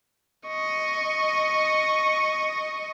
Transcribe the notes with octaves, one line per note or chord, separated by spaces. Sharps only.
D#5 C#6